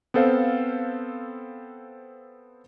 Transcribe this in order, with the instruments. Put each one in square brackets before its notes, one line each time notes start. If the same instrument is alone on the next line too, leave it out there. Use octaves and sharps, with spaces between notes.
[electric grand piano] B3 C4 A4 C5 F5